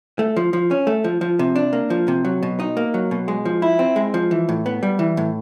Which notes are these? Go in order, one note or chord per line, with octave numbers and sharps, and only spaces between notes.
A3
F3
F3
C#4
A3
F3
F3
C3
D4
A#3
F3
C3
F#3
B2
D#4
A#3
F#3
B2
G#3
F3
E4
C4
G#3
F3
E3
A2
B3
G3
E3
A2